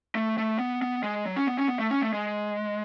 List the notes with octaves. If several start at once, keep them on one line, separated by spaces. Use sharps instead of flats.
A3
A3
B3
B3
G#3
F#3
C#4
B3
C#4
B3
A3
C#4
A3
G#3